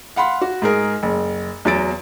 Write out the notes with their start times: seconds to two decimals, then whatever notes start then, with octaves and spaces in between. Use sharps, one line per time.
0.16 F5 F#5 B5 C6
0.42 F#4
0.62 G#2 G#4 A#4
1.03 F#1
1.65 E2 F#3 A6 D7